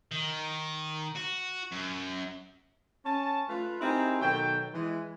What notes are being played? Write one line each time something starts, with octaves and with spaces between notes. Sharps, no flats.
D#3
F#4
F#2
C#4 A5
A3 F4 B4
C4 D#4 E4 G4 G#4 A#4
B2 D#3 F#3 A4 G5
E3 G#3